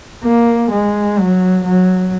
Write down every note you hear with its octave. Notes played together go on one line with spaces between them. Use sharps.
A#3
G#3
F#3
F#3